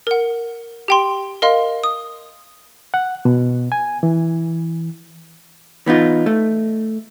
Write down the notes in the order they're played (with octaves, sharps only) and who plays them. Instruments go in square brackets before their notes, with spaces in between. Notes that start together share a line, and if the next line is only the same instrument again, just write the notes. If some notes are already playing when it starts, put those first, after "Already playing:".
[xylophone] A#4 F#5
G4 G5 C6
A#4 D#5 F5 C6
D#6
[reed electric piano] F#5
B2
G#5
E3
[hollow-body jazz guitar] E3 B3 D#4 F4
A3